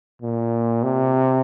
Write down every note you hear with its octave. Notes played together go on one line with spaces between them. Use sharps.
A#2
C3